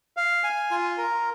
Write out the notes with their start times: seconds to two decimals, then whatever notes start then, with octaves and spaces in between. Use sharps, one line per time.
0.17 F5
0.44 G#5
0.71 F4
0.98 A#4